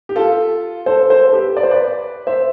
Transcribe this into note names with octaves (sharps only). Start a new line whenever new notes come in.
G4
F4 A4
A4 C5
A4 C5
A4
G4 B4
D5
C5
B4 D5
C5 E5